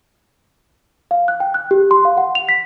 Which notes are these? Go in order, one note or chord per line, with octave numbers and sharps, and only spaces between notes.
F5
F#6
G5
F#6
G4
C6
F5
F#5
F7
B6